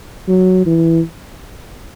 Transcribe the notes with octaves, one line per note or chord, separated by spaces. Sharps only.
F#3
E3